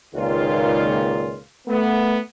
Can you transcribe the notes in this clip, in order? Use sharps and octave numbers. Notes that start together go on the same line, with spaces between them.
C#2 A#2 D#3 F4
A3 B3